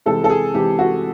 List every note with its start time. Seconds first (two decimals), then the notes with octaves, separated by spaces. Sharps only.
0.06 C3 E3 G#3 C4 A4
0.24 A4
0.29 G#4
0.54 C3 E3 G#3 C4 G4
0.79 F#4